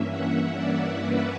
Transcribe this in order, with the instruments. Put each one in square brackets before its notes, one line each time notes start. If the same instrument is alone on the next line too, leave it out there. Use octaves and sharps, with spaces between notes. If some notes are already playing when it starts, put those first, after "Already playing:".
Already playing: [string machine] G2 E3 A#3 C#4 E5
F#5
D5
B4